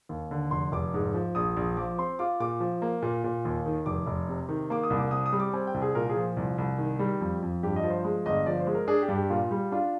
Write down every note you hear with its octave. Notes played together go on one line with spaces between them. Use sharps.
D#2
D3
F1 C6
F1 D6
G#2
F3
A#1 D#6
A#1
F3 D6
C4 C6
F4 D6
A#2 D6
F3
A#3
A#2
A#2
D#2
D#3
F1 D6
F1
C3
D#3
A#3 D6
D#6
C2
D6
C3 D#6
D#6
G3
D6
C4 G#5
G5
C2
G#4
A#2 A#4
G#4
F3
C2
C2
D#3
G3
F2
F2
G2 G4
D#5
F3
C5
G#3
G1 D#5
F3 D5
C5
G#3
A#4
D4 G#4
G4
G2
G4
A#2 F4
G3
D4 F4